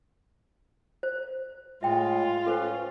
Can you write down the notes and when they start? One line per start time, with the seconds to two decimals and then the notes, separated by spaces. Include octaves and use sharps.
1.03 C5
1.83 A2 G#3 F4 E5 G5
2.46 C#4 A4 B4 C5